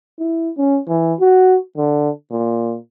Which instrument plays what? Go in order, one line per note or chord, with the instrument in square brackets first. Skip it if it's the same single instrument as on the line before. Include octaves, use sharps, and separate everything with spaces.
[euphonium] E4
C#4
E3
F#4
D3
A#2